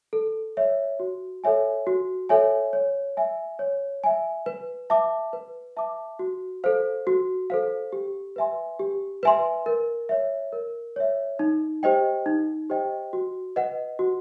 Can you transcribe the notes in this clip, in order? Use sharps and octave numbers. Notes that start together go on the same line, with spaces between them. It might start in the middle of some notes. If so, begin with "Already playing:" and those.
A4
C#5 E5
F#4
A4 C#5 E5 G#5
F#4
A4 C#5 E5 G#5
C#5
E5 G#5
C#5
E5 G#5
B4
E5 A5 D6
B4
E5 A5 D6
F#4
A4 C5 F5
F#4
A4 C5 F5
G4
B4 E5 G#5 C6
G4
B4 E5 G#5 C6
A#4
C#5 E5
A#4
C#5 E5
D#4
G4 C5 D#5 G5
D#4
G4 C5 D#5 G5
F#4
B4 D#5 F#5
F#4